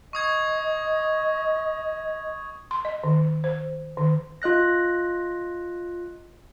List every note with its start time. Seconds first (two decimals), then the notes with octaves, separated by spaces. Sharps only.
0.13 D#5 C#6 D#6 G#6
2.71 C6
2.85 D#5
3.03 D#3
3.44 C5
3.97 D#3
4.42 F4 D#5 F#6 A#6